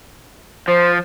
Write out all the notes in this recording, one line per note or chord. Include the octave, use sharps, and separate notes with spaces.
F3 C5